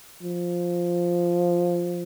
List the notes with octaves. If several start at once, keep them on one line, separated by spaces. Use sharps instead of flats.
F3